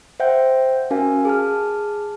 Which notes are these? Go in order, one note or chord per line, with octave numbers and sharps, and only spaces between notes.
C5 E5 F#5 G5 G6
C#4 F#4 A#4 F5 G#5
G#4 A5 F6